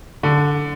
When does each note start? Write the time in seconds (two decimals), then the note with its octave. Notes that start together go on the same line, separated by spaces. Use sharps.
0.23 D3